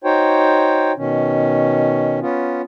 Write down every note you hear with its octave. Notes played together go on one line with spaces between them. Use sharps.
D#4 F#4 C5 C#5 G5
B2 D#3 C#4
B3 C#4 F4